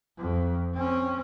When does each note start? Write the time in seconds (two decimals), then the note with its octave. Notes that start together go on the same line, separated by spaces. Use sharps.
0.18 F2
0.75 C4 C#4